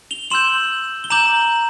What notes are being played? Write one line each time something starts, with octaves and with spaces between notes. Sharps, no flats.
F7 G7
C6 E6 G6 E7 F#7
G7
A#5 D6 G6 E7 F#7